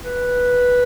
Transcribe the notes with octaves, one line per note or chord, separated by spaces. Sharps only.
B4